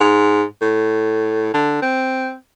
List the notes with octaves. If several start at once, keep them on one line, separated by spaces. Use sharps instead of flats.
G#2
A2
D3
C4